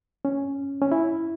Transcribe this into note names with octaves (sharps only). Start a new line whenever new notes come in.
C#4
C#4
E4